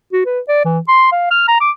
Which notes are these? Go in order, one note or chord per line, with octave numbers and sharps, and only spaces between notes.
F#4
B4
D5
E3
C6
F5
F6
A#5
D6